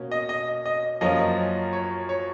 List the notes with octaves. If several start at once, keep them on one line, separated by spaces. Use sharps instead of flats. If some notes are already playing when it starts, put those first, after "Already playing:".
Already playing: B2 A#3 C#4
D#5
D#5
D#5
F#2 F3 A#3 C#4 D#5
C#5
C#5